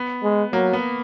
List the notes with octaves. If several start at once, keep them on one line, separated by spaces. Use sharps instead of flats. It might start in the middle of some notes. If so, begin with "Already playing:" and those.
Already playing: B3
G#3
F#3 A#3
B3